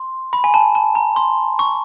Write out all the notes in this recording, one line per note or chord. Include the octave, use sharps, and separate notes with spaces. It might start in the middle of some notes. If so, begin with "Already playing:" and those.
Already playing: C6
B5
G#5
A5
A5
A#5
C6
C#6